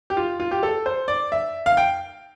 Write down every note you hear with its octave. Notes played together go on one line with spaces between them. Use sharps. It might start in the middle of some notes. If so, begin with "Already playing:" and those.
G4
F4
F4
G4
A4
C5
D5
E5
F5
G5